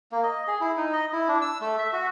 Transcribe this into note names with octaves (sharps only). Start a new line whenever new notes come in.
A#3
D#5
G#4
E4
D#4
D#5
E4
D4
E6
A3
E5
F#4